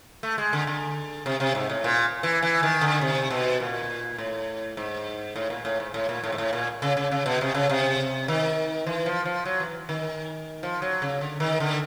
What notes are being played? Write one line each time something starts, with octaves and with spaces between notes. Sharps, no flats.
A3
G#3
D3
D3
C3
C3
G#2
A2
A#2
E3
E3
D#3
D3
C3
B2
A#2
A2
G#2
A2
A#2
A2
G#2
A2
A#2
A2
G#2
A2
A#2
C#3
C#3
C#3
B2
C3
C#3
C3
D#3
E3
F3
F3
F#3
E3
D#3
F3
F#3
C#3
D3
D#3
D3